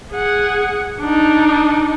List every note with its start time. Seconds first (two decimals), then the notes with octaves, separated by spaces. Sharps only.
0.11 G#4 F#5
1.01 D4 D#4